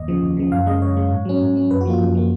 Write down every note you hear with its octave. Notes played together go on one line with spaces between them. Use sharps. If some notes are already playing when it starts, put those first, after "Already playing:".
Already playing: D#2 D#5
C#3 F3
D#2
C#3 F3
F#2 F5
C#3 G#3 D#5
F#2 C#5
C#3 G#3
G#2
F#3 C#4
G#2
F#3 C#4
F#2 B4
F#4
F3 A#3 F4
F#2
F3 A#3